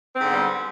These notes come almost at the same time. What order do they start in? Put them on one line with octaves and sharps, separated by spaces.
C4 G#2 D3 B3 G3